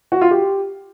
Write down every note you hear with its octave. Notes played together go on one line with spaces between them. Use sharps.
F#4
F4
G4